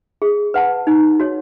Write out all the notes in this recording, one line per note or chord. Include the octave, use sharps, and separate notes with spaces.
G#4
B4 F#5 A5
D#4
F#4 C#5